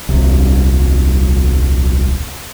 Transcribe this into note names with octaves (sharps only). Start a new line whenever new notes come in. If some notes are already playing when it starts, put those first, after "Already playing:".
D#1 C2